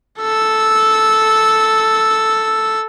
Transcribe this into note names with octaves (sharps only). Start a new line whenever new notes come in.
A4 E6